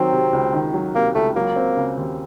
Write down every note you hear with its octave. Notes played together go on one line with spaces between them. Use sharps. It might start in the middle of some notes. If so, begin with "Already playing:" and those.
Already playing: D#3 F#3 C4
C3
C#2
D#3
F#3
C3 A#3
C#2 A3
F#3 A#3
C4
C#3
D#2